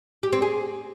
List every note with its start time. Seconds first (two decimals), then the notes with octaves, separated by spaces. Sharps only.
0.23 G4
0.33 C4
0.42 G#4